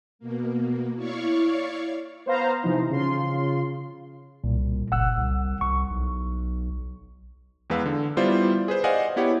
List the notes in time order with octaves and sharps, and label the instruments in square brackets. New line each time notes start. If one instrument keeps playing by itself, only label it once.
[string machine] B2 A#3
E4 C#5 D5 F5 C#6
[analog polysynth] B3 C5 F5 A#5
C3 E3 F3 D#4
C#3 F4 C6
[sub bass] C2 [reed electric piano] A#2
[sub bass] F#1 [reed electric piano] F#5 E6 F#6
[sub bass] C2
[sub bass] C2 [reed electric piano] C#6
[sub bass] B1
[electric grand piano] E2 G#3 B4 F5 E6
D3
G3 B3 E4 F4 C5 D5
G#4 B4 C5
C5 D5 D#5 F5 F#5 G#5
B3 E4 G4 C#5 F#5